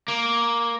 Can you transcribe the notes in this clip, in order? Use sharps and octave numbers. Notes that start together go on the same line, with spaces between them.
A#3